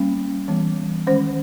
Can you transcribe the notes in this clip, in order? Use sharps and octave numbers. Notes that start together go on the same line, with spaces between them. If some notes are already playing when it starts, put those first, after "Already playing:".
Already playing: G3 A#3 C#4
E3 G3 B3
D#3 G#3 C#4 C5